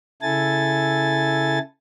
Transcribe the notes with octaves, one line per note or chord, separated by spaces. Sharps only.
C#3 E4 A4 G#5 A6